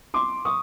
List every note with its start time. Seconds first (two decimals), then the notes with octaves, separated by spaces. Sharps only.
0.14 C6 D6
0.45 C#6 D#6